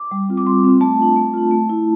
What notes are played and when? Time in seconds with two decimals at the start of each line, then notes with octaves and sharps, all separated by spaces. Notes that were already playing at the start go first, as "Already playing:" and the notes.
Already playing: D6
0.11 G3
0.29 C4 F4
0.37 D6
0.46 G3 C6
0.64 C4 F4
0.81 A3 A5
1.00 D4 F4
1.16 A3
1.34 D4 F4
1.51 A3
1.69 E4